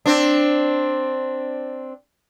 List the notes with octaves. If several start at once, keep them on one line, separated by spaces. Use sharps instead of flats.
C4 D4